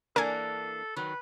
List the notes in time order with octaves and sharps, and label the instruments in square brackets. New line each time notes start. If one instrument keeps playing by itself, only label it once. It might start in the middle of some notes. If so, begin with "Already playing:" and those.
[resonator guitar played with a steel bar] E3 A#3 D4 [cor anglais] A4 [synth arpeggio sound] A#4 G#5
[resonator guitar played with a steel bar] D#3 F#3 [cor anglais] B4